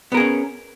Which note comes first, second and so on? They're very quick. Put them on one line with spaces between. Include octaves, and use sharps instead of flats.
B3 A#4 G#4 C#4